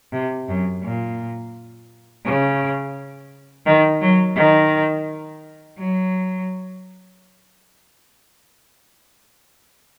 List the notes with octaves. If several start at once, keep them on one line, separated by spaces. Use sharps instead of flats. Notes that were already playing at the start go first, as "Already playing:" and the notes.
C3
F#2
A#2
C#3
D#3
F#3
D#3
F#3